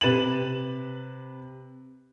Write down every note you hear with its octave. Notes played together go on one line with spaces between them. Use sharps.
C3 B4 A6 D#7 E7 F#7